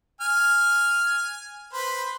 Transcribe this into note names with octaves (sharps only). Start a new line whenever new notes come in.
G#5 F6
B4 C5